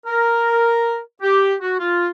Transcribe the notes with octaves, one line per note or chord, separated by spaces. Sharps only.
A#4
G4
F#4
F4